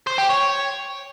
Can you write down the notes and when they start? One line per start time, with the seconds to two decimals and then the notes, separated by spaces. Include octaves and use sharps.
0.07 C5
0.18 G4
0.29 C#5